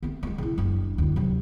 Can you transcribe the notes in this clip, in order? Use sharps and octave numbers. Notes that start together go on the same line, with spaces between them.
A3 C4
G#3 A3
C#3 E4
F#1 D4
D2 E4
C3 F#3